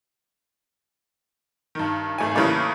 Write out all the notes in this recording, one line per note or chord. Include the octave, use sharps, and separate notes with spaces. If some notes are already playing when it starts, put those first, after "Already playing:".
G2 D#3
G#1 A3 G#5
A2 C#3 E3 G3 A3 A#3